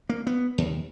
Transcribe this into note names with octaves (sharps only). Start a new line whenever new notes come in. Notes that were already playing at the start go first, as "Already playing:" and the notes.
A#3
B3
D#2